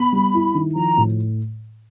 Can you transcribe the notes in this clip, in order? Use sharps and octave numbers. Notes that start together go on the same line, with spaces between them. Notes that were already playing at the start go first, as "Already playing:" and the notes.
Already playing: B3 B5
G3
E4
D#3
F3 A#5
A2